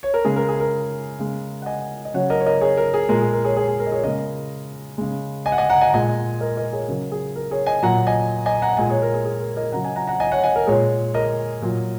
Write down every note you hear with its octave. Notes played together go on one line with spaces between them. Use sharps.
C#5
A#4
C#3 G#3 G#4
A#4
G#4
A#4
C#3 G#3
F#5
D#5 G#5
D#5
C#3 F#3 C#5 F#5
A#4 D#5
C#5
A#4 D#5
G#4 C#5
A#4
G#4
A#2 G#3 A#4
G#4
A#4
G#4 C#5
G#4 C#5
G#4
A#4
D#5
G#4 C#5
C#3 G#3 A#4 D#5
C#3 G#3
D#5 G#5
F#5
D#5 G#5
F#5 A#5
D#5 G#5
A#5
A#2 G#3 D#5 G#5
A#4 D#5
A#4 D#5
G#4 C#5
C#3 F#3 A#4
G#4
A#4
G#4 C#5
D#5 G#5
A#2 F#3 F#5 A#5
D#5 G#5
D#5 G#5
F#5 A#5
A#2 G#3 D#5 G#5
G#4 C#5
A#4
G#4
G#4
A#4
A#4 D#5
C#3 F#3 F#5 A#5
D#5 G#5
F#5 A#5
F#5 A#5
D#5 G#5
C#5 F#5
D#5 G#5
A#4
A#2 G#3 G#4 C#5
A#4 D#5
A#2 F#3